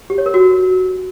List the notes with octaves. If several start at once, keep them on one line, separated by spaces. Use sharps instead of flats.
G4
C#5
A#4
F#4